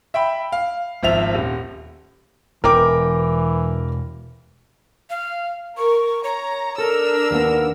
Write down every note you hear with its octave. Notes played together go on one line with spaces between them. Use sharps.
E5 G5 B5
F5
G#1 F3 E5 F7
D#1
E1 E3 A#4 G5 D6
F5
A#4 C#6
C#5 A#5
D4 A4 A#4 E6
D#2 A#3 B3